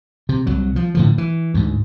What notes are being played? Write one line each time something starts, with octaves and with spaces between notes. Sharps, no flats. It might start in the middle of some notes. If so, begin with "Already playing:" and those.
C3
C2 F#3
F3
A2 D3 F3
E3
D2 G#2